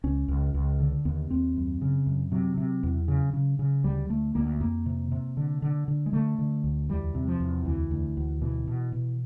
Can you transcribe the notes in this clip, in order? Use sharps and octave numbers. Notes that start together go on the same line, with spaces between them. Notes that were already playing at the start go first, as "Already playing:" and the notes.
C#2 C#4
C#2
C#2
D3
D#2 B3
D#2 C4
F#2
C#3
F#2
C3 F#3
C3
E2
C#3
C#3
C#3
D2 G3
D2 A3
D2 A#3
F2 A#3
C3
C3
D3
D3
D3
G#3
D3 A3
D3
D2
E2 G3
C3
F3
E2
D2 E3
D2
D2
B2 E3
B2
B2